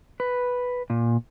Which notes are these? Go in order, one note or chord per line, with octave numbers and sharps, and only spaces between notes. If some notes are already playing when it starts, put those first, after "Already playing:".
B4
A#2